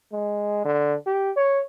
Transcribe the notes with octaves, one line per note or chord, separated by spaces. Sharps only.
G#3
D3
G4
C#5